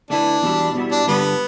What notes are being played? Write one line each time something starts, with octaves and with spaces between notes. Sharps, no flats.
D3 A3 D4 E4 B4
E2 B2 G3 E4
B2 G3 B3 E4
D4
G2 D3 G3 B3 D4